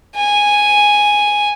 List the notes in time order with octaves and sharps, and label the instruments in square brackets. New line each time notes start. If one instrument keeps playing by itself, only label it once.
[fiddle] G#5